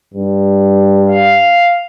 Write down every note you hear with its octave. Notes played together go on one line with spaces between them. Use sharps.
G2
F5